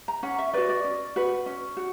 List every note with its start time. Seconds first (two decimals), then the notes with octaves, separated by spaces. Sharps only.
0.08 A#5
0.23 C#4 F#5
0.39 E5
0.53 F#4 B4 D5
0.69 D5
0.84 C#4
1.16 F#4 B4
1.46 C#4
1.77 F#4